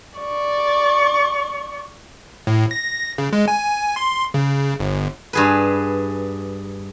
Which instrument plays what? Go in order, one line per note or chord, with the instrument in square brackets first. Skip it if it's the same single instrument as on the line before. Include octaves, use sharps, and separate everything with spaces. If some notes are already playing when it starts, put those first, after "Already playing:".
[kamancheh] D5 C#6
[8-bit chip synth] A2
A#6
C#3
G#3
G#5
C6
C#3
G1
[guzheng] G2 G#4 B4